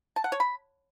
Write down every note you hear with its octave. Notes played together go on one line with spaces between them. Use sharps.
A5
F#5
C#5
B5